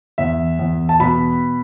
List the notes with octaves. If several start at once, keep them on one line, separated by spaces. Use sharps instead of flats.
E2 E5
E2
A5
B2 B5